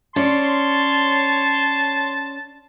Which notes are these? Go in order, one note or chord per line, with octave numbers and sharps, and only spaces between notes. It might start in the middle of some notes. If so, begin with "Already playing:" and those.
C#4 C#5 D5 A5 C6